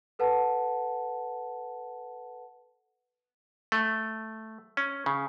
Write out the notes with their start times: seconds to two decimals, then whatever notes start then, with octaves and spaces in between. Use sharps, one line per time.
0.19 A4 B4 F#5 A5
3.72 A3
4.77 C#4
5.06 C#3